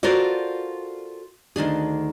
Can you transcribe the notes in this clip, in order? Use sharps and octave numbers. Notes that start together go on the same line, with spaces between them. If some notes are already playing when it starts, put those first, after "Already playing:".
F4 F#4 A4 A#4 C5 D5
D2 D#3 D4 G#4